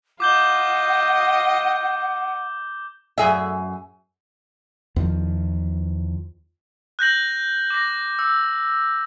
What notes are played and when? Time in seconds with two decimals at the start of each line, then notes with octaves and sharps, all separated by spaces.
0.20 F4 D#5 F#5 D6 G6 G7
3.18 F#2 G#4 E5
4.96 E2 D#3 F3
6.99 F#6 G6 A#6 F#7
7.70 D6 A#6
8.19 E6